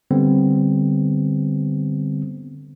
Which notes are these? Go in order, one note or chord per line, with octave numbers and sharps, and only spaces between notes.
D3 G3 B3 C4